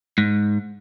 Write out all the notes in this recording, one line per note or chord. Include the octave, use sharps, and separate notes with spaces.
G#2